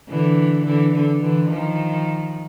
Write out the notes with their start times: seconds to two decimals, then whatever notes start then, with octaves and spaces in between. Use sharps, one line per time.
0.09 D3 E3
0.65 D3 E3
0.94 D3
1.22 D3 E3
1.50 D#3 F3